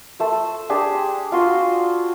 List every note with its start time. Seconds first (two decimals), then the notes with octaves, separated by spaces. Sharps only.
0.20 A3 C5
0.69 D4 G4 G#4 C5
1.32 F4 F#4 C6